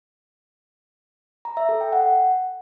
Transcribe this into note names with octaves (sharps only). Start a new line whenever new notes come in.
A#5
E5
A4
G5
F#5